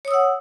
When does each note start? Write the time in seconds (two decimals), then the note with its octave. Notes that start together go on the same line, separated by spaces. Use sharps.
0.05 C#5
0.08 D#6
0.11 E6
0.14 F#5